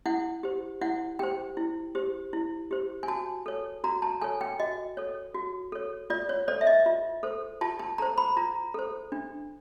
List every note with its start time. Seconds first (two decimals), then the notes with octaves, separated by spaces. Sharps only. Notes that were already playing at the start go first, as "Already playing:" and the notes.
0.06 E4 F#5
0.43 G4 C5
0.81 E4 F#5
1.19 G4 C5 G5
1.57 E4
1.95 G4 C5
2.33 E4
2.71 G4 C5
3.03 G#5
3.08 F#4 A5
3.46 A4 C#5
3.84 F#4 A#5
4.02 A5
4.21 A4 C#5 G#5
4.41 G5
4.59 F#4 D#5
4.97 A4 C#5
5.34 F#4
5.72 A4 C#5
6.10 F4 D5
6.29 C#5
6.48 A4 C5 D5
6.61 E5
6.67 D#5
6.86 F4
7.23 A4 C5
7.61 F4 A5
7.79 A5
7.98 A4 C5 A#5
8.18 B5
8.37 F4 A#5
8.74 A4 C5
9.12 D4